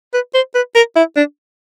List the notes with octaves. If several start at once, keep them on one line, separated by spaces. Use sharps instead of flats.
B4
C5
B4
A#4
E4
D4